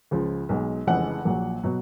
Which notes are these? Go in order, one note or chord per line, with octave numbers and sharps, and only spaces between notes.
C#2 C#3 F3
B1 B2 G#3
F1 F2 C#3 E3 G#3 F#5
A#1 A#2 F#3
B2 F#3